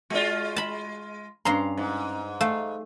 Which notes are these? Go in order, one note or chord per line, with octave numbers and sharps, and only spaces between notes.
G#3 F4 F#4 D5
A5 B5
G2 C#4 F5 A#5 C6
G#2
A3 F5